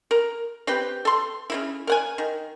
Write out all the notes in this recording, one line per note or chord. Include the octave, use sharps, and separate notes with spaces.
A#4
C4 G4 B4 G5
A4 C6
C#3 A#3 E4
A#4 F#5 G#5
D#3